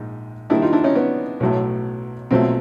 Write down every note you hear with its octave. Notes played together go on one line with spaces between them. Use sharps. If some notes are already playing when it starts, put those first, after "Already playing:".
Already playing: A#1 G#2
D#2 D#3 G3 D4 E4
D#4 F4
D4 E4
C#4 D#4
B3 C#4
B1 A2 F#3 A3
B1 A#2 F#3 A3 C4